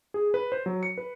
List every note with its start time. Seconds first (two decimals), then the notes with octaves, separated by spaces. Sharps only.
0.14 G#4
0.34 B4
0.52 C5
0.66 F#3
0.83 C#7
0.98 B4